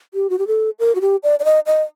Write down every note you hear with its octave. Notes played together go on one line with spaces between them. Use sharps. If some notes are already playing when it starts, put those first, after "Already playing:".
G4
F#4
G4
A4
A#4
F#4
G4
D5
D5
D#5
D#5